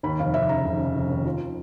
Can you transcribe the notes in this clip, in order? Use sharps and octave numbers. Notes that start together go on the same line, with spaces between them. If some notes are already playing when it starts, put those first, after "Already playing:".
D#2 B5
F1 F5
F1 E5
C#3 A#5
F1
C#3
F1
D#2
F3